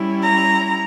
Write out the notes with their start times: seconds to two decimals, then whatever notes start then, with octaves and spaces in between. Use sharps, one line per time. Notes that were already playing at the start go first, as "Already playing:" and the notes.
Already playing: G3 C#4 E4
0.22 A#5